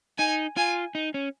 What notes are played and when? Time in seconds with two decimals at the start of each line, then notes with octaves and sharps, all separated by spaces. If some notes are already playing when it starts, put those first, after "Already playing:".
0.18 D#4 G#5
0.57 F4 G#5
0.95 D#4
1.14 C#4